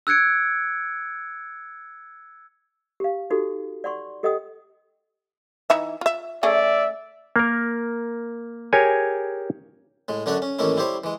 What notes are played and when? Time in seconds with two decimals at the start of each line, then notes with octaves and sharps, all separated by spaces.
0.07 E6 F#6 G#6 C#7 D7
3.00 G4 F5
3.30 D#4 F#4 G4 A4
3.84 D5 F#5 C6 C#6
4.23 G4 A4 D#5 F#5 G5 D#6
5.70 E3 D#4 E5
6.01 F4 E5
6.43 A3 C#4 G#4 D5 E5
7.36 A#3 A#4
8.73 G4 G#4 A#4 C#5 G#5
10.08 A2 G#3
10.26 F#2 D3 A3 D4 C#5 F#5
10.42 C#4
10.59 A1 D#3 A3 A#3 C#4 E4
10.77 G3 E4 G4 C5 C#5
11.04 E3 G#3